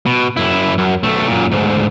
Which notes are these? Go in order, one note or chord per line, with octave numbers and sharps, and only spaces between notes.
B2
F#2 E4
F#2
B1 A3
F#2 A#2
D2 G#2